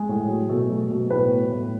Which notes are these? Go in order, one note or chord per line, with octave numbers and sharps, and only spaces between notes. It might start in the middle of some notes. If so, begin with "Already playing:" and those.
Already playing: G#3 G#4
A2
F#3
B2 A3 A4
F#3
B2
A2 B3 B4
F#3
A2